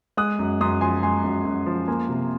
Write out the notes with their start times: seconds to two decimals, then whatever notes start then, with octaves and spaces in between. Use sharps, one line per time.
0.17 G#3 D#6 F#6
0.39 F#2
0.61 F#2 C6 D#6
0.81 F3 G#5 C6
1.03 G#3 G#5 C6
1.24 F#2
1.45 F#2
1.66 F3
1.88 A#3 G#5 C6
2.09 C3